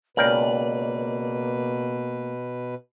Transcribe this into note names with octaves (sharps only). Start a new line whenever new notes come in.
C#2 B2 A#3 A#4 B4 D5 G5